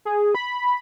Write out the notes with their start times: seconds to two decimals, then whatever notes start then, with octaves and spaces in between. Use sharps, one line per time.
0.05 G#4
0.35 B5